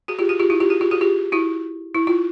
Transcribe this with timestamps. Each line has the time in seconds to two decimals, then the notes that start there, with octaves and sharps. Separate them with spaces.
0.08 F#4 G#4
0.19 F4 G4
0.29 F#4 G#4
0.40 F4 G4
0.50 E4 F#4
0.60 F4 G4
0.70 F#4 G#4
0.81 F4 G4
0.91 F#4 G#4
1.01 F4 G4
1.32 E4 F#4
1.95 E4
2.07 F4